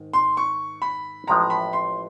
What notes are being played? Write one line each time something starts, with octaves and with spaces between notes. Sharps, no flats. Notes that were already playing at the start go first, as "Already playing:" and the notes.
Already playing: G#2 D#3 G#3
C6
C#6
B5
A1 A2 F3 G#3 A#5
B5
C6